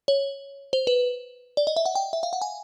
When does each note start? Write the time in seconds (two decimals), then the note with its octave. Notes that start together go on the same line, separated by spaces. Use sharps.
0.08 C#5
0.73 C5
0.87 B4
1.57 D5
1.67 D#5
1.76 E5
1.86 F#5
1.95 G5
2.13 E5
2.23 F5
2.33 F#5
2.42 G#5